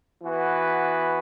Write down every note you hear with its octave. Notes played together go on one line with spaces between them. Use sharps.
E3 B3 F#4 B4